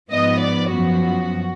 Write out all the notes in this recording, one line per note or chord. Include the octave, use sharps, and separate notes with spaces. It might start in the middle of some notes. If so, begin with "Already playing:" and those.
G#2 F3 B3 D#5
D5
F#2 F3 B3 F#4